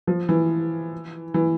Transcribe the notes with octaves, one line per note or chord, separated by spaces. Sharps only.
F3
E3
E3